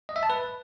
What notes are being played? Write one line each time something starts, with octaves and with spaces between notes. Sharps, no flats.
D#5
E5
A5
B4